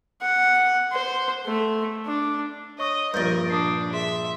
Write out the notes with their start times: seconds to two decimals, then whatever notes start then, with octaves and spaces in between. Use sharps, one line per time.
0.21 F#5
0.92 C5
1.46 A3
2.06 D4
2.79 C#5 D#5 C#6 D#6
3.14 A#1 G2 A#4 G6 A6 A#6
3.50 D4 D6 D#6 C7
3.93 G#4 E5 C6